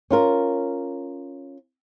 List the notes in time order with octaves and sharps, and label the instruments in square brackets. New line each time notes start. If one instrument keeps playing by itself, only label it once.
[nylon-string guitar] C#4 F4 A#4